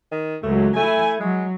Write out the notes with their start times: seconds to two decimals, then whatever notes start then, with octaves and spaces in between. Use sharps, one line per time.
0.12 D#3
0.43 C#2 F#3 A3
0.76 A3 E4 G#5
1.20 F#3 G#3